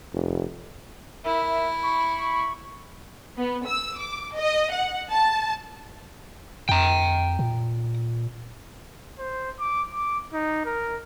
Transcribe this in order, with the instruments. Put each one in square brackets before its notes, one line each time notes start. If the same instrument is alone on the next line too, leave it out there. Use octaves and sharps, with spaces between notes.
[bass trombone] F1
[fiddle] E4 [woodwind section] A#4 E5
[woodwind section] B5 C#6
[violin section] B3
E6
D6
D#5
F#5
A5
[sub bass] F2 [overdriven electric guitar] G5 A#5
[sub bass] A#2
[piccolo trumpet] C5
D6
D6
D#4
A#4